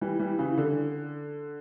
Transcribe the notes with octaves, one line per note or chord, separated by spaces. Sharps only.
E3 G3
E3 G3
C#3 E3
D3